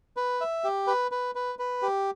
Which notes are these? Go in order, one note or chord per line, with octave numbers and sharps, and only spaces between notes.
B4
E5
G4
B4
B4
B4
B4
G4